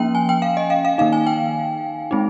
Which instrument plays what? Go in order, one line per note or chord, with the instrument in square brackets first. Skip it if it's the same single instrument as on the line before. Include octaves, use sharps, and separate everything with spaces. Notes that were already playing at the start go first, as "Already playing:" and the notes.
Already playing: [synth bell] F3 A#3 C#4 G5
G#5
G5
F5
D#5
F5
F5
D#3 A#3 D#4 F5
G#5
G5
G#3 C4 D#4